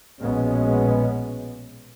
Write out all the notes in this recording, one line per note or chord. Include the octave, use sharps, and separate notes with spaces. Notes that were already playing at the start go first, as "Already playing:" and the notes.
A#1 B2 G#3 B3 C#4